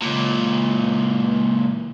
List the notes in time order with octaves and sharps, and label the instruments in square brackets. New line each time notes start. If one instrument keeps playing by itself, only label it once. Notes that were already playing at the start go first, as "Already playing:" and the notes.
[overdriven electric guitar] C#2 A#2